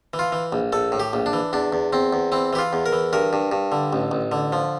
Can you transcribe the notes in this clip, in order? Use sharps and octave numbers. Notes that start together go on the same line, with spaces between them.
E3
F4
E3
A#1
A#1 A4
A2
G4
A#1
D4
E3
E2 D4
E2
E2 C4
E2
E3 C4
E3 G4
F4
E2
A#4
E3
G2 A#4
G2
G2
D3
A1
A1
D3
F3